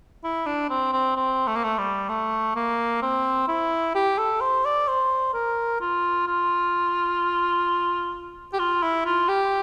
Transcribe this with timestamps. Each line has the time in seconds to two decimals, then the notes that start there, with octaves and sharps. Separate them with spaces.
0.24 E4
0.46 D4
0.70 C4
0.93 C4
1.16 C4
1.47 A3
1.55 A#3
1.64 A3
1.78 G3
2.09 A3
2.56 A#3
3.02 C4
3.48 E4
3.95 G4
4.18 A4
4.41 C5
4.65 D5
4.88 C5
5.34 A#4
5.81 F4
6.27 F4
8.53 G4
8.59 F4
8.83 E4
9.05 F4
9.28 G4